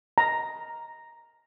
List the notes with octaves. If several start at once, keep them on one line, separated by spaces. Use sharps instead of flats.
A#5